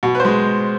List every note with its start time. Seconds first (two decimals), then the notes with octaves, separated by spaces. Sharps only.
0.03 B2
0.15 B4
0.20 G#3 C5